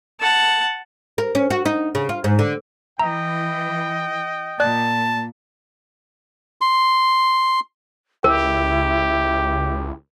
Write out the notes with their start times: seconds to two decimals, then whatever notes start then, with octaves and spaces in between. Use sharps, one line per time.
0.21 F#5 A5
1.18 A#4
1.35 C#4
1.50 F#4
1.65 D#4
1.95 C#3
2.09 F4
2.24 G#2
2.39 D3
2.99 E3 D#5 G5 A#5
4.60 A#2 D5 A5 F#6
6.61 C6
8.24 C#2 E4 G4 A#4